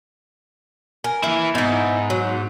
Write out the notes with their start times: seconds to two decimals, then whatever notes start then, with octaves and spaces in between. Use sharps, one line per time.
1.04 A#4 G#5
1.23 E3 A#3 E4
1.55 G#2 B3 D#4 E4
2.10 F#3